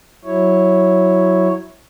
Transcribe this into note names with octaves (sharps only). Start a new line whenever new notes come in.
F#3 E4 C#5